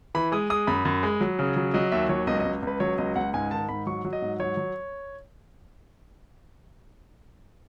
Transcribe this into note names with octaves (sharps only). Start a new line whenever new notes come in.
E3 B5
G#3 D#6
G#3 D#6
F#2 B5
F#2
G#3
F#3
C#3
F#3
F#3 D#5
D#2 E5
F#3 C#5
C#2 D#5
D#5
C#2
C#2 B4
F#3 C#5
C#2 D#5
C#2 F#5
G#2 G#5
D#3 A5
G#2 B5
F#3 C#6
F#3
D#5
G#2
F#3 C#5
F#3